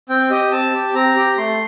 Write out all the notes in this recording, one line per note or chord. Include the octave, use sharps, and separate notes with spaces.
C4 G5
G4 D#5
C4 A5
G4
C4 A#5
G4
A3 C6